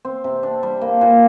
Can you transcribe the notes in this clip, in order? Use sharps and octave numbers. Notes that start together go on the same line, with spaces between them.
C4
C3
D4
G3
A#3
A#2